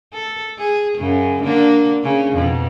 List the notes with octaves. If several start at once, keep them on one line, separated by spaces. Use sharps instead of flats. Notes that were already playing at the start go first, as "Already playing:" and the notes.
A4
G#4
F#2 C#3
D3 A#3 D4
C#3
F2 B2